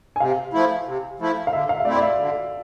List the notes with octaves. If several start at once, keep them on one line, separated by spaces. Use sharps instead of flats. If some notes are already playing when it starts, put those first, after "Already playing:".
G#5
C3 F5
F3 A3 E4
C3
F3 A3 E4
F5
D3 E5
F5
E5
A3 C4 E4 D5
D5
E5
D3